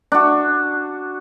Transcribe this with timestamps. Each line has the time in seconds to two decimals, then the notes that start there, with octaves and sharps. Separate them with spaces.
0.12 D4 F#4